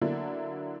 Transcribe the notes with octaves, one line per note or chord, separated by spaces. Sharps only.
D3 F#3 A#3 D4 E4